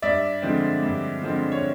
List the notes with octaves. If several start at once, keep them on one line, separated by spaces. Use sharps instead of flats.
G2 D5 E5
D3 F3 G#3 C4
G2
D3 F3 G#3 C4
C#5